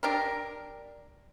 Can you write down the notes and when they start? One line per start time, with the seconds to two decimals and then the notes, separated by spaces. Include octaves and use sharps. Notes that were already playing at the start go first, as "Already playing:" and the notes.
0.03 D4 G4 A#4